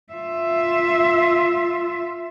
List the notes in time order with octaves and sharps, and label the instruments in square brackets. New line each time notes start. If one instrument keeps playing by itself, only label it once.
[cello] F4 E5